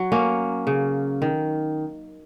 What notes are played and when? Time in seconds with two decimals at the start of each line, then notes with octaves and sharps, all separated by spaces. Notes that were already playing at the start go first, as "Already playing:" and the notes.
Already playing: F#3
0.12 A#3 C#4
0.67 C#3
1.22 D#3